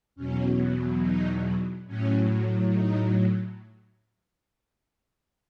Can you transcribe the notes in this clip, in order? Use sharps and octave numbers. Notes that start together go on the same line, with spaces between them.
E2 B2 F#3 C#4
D#4
A2 F#3 C#4
D#4